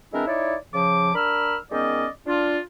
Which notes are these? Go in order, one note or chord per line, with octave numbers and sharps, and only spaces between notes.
E3 G#3 C4 D4 E4 A#4
D#4 E4 C#5 D5
C#3 F3 D6
D4 A#4 B5 E6 F6
D#3 G#3 B3 C#4 D5 D#5
D4 F4